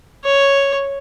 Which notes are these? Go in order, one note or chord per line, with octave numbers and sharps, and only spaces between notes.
C#5